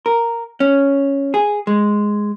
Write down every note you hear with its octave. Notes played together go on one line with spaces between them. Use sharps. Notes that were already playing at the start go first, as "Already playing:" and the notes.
A#4
C#4
G#4
G#3